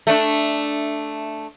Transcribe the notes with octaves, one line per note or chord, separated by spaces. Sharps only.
A3 D4